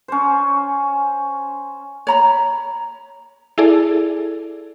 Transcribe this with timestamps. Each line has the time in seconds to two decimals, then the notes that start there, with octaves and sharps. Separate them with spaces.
0.08 C#4 C5
2.07 C#5 A#5 B5
3.58 E4 G#4 A4 D5